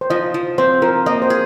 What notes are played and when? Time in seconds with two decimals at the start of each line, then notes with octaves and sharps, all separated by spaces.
0.01 C5
0.10 F3 D#5
0.34 F3
0.58 C4 C5
0.82 F3 A#4
1.06 A#3 D#5
1.22 C5
1.30 G#4